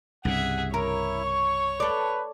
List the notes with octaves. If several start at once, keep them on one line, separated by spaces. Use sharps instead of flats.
C2 G2 C#3 G#4 E5 F#5
E4 A#4 C#5
C#6
A4 B4 D5